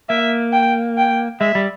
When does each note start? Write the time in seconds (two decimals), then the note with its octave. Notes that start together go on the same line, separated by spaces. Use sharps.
0.09 A#3 E5
0.53 G5
0.98 G5
1.41 G#3 E5
1.55 G3